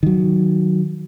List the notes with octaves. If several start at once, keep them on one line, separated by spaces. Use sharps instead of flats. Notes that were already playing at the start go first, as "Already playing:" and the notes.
D#3 F#3